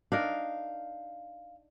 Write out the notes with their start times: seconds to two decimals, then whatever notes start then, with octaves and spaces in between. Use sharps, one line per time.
0.12 D4 D#4 A#4 F5